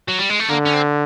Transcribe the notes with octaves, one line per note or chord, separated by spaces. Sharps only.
F#3
G3
G#3
A3
D3 A#3
C#4
C4